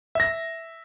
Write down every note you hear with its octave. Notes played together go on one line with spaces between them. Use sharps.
E5 A#6